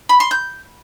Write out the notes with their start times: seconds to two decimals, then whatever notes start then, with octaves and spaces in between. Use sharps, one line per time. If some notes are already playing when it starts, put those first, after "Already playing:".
0.09 B5
0.20 C6
0.31 G6